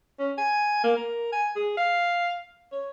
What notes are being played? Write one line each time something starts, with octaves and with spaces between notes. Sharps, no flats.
C#4
G#5
A#3
A#4
G#5
G#4
F5
C#5